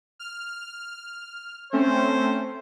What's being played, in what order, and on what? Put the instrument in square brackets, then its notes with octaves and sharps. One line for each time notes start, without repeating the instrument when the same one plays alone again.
[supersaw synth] F6
[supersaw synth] A3 C4 C#4 [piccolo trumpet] C5